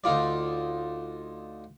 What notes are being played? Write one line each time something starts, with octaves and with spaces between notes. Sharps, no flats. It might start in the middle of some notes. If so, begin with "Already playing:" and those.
D2 D#4 F4 D5